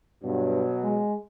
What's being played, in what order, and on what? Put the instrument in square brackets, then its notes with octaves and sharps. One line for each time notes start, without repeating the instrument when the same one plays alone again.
[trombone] G2 [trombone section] B2 F#3
[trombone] G#3